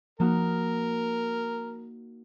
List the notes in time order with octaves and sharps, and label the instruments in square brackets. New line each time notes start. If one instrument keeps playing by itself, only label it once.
[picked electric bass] F3 [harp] A#3 D#4 F#4 [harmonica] A#4